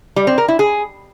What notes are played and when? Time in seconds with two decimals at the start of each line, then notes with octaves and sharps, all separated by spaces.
0.16 G3
0.27 C4
0.38 A#4
0.48 E4
0.59 G#4